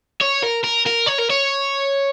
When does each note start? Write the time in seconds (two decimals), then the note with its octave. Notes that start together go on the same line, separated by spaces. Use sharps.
0.21 C#5
0.43 A#4
0.63 A#4
0.86 A#4
1.06 C#5
1.18 A#4
1.30 C#5